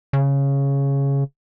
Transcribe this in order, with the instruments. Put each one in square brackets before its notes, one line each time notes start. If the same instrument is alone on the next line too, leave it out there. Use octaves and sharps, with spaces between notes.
[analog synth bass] C#3